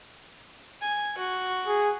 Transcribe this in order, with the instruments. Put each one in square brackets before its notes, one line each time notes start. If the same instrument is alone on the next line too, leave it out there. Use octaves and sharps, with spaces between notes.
[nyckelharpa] G#5
F#4
[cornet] G#4